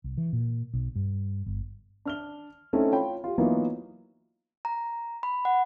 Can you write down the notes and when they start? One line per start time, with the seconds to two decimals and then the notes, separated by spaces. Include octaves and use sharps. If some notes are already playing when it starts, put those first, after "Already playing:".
0.04 C2
0.17 E3
0.33 A#2
0.73 B1
0.96 G2
1.46 G1
2.05 D4 F6 G7
2.73 A3 C4 C#4 D#4 E4 A4
2.92 F4 C#5 G5 B5
3.24 F4 G4
3.38 E3 F#3 A#3 B3 D#4 F4
4.65 A#5
5.23 B5
5.45 F#5